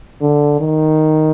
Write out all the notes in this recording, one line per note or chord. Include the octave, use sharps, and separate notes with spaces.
D3
D#3